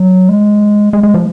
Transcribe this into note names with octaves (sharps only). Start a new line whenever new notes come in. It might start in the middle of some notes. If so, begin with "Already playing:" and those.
Already playing: F#3
G#3
G#3
G#3
F3